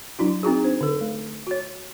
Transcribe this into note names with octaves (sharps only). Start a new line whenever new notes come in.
F#3 D4 E4 F#4
C4 D#4 F#4 G#4
D4 C5
D3 A4
A3
F#4 C#5